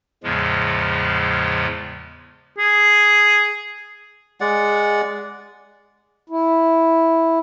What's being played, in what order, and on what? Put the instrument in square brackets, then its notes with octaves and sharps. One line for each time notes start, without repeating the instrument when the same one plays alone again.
[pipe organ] E2 A2 C#3 F3 G#3
[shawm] G#4
[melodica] G#3 D5 F#5
[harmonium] E4